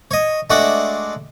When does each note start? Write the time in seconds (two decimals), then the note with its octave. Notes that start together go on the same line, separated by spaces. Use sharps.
0.11 C#5 D#5
0.50 G#3 A3 D4 F#4 E5 F#5